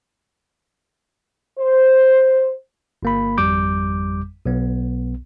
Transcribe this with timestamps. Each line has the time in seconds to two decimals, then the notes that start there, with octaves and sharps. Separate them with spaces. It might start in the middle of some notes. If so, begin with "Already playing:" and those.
1.59 C5
3.03 G1 A#3 B5
3.38 G#1 F2 G3 D6 G6
4.46 B1 B3